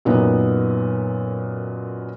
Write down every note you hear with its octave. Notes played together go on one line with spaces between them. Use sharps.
F#2 A#2 B3 D#4